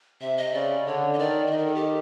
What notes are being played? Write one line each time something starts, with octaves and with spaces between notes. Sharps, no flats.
C3 E5
D#5
C#3 D5
D3 C#5
D#5
D#3 D5
E5
D#3 D#5
A#4
A4
G4